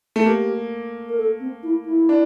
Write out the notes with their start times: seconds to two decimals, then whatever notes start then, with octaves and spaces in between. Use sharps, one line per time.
0.16 A3
0.26 A#3 G4
1.09 A#4
1.18 A4
1.40 C4
1.63 E4
1.85 E4
2.09 D4